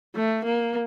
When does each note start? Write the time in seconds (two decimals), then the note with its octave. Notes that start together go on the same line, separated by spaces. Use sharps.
0.16 A3
0.45 A#3